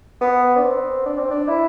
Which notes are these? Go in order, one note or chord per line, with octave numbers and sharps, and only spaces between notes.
B3
D4
C4
D4
C4
D4
E4